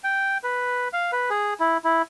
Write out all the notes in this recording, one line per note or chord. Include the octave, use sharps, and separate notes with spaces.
G5
B4
F5
B4
G#4
E4
E4